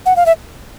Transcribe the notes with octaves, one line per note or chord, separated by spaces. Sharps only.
F#5
F5
E5